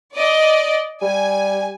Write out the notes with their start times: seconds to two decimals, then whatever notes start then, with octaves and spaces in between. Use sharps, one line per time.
0.16 D5 D#5
1.02 G3 G#5